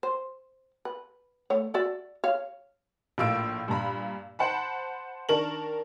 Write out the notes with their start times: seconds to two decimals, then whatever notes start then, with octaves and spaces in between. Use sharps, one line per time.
0.03 C5
0.85 B4
1.50 A3 C#5
1.74 F#4 D5 E5
2.24 C#5 F5
3.18 A#1 A2 A#3 F4 E6 D7
3.68 G2 A#2 A#5 B5
4.39 C5 F#5 A5 B5
5.29 D#3 D4 A#4 A5 C#6 F#7